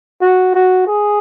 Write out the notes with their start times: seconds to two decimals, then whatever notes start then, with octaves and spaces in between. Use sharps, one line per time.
0.22 F#4
0.55 F#4
0.87 G#4